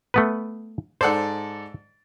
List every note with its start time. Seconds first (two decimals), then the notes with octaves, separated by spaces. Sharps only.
0.14 A3 B3 B4
1.01 G#2 A4 C5 D5 F#5